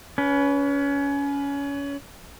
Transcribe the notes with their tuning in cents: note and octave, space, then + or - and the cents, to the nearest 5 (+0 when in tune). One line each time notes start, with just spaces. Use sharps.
C#4 +25 B4 +0